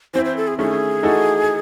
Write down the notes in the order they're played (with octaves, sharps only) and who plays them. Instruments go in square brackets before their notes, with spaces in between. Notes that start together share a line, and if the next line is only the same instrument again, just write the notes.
[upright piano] E3 C4 E4 [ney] C5
[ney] C5
A4
G#4
[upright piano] D#3 A3 C#4 E4 [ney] G#4
[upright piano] E3 A3 D#4 F#4 A4